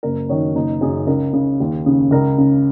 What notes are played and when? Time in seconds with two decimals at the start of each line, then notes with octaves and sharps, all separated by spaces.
0.03 F#1 A#4
0.29 F#2 D#3 C#5
0.55 F#1 D#4
0.81 F#2 C#3 G#4
1.07 C#2 A#4
1.33 C#3
1.60 D#2
1.86 C#3
2.11 C#2 A#4
2.38 C#3